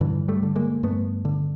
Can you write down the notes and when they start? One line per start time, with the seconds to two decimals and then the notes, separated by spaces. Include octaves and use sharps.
0.01 G2 D3 E3
0.28 G3 A3
0.43 D3
0.56 G#3 A#3
0.83 G2 A3 B3
1.25 D3